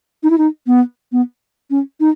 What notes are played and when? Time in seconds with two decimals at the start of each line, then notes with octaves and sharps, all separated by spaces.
0.23 D#4
0.30 E4
0.38 D#4
0.67 B3
1.12 B3
1.71 C#4
2.00 D#4